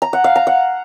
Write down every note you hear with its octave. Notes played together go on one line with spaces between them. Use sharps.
A#5
F#5
F5
A#5
F#5